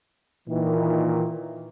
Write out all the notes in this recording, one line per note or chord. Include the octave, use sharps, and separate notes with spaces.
A#2 D#3 E3